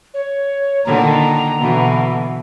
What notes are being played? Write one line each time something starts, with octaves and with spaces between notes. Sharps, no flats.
C#5
A#2 D3 D#3 A#5
B2 D3 E3